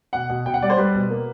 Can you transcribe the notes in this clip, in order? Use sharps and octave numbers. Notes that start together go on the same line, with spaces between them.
B2 F#5
B2
B2 G5
F#5
G3 D5
C5
G3 B4
B2
A#3